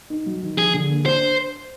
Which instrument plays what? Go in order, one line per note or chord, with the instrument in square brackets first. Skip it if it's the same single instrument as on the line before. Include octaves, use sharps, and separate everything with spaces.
[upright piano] D#4
F#3
D#3
[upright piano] F3 [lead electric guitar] G#4
[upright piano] D3
A#3
[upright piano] D4 [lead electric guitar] C5